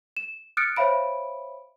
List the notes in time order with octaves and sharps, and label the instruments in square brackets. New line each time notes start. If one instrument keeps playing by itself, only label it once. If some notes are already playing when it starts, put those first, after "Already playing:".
[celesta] E7
D#6 F6 F#6 A6 C#7 D7
C5 C#5 E5 F5 B5 D7